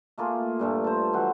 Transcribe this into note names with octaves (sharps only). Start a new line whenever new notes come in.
A3 A#3 F4 G#4
G2 A#2 A3
A4 C5
E3 F#3 F#5 C6